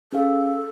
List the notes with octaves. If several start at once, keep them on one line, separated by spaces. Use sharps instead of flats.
C#4 G#4 A4 B4 F5